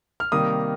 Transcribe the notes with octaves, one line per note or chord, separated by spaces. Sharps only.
F6
C3 D#3 G3 A#3 D#6